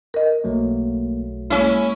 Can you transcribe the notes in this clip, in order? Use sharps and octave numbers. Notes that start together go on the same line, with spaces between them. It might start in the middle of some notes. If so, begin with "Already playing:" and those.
A#4 D#5
B1 F#3 A3 A#3
G#3 A#3 C#4 E4